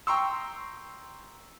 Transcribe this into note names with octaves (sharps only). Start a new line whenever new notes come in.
G5 A#5 C6 C#6 E6